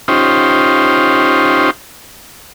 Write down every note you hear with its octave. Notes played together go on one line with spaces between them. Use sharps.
C#4 D#4 F4 G4 C5